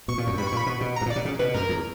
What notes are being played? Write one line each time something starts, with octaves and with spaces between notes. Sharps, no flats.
B2 C#6
A#2
F#2
G2 B5
C#6
A#2 B5
B2
B2
A#5
G2
A#2 D5
B2
C#3
B2 B4
F#2 A#4
E2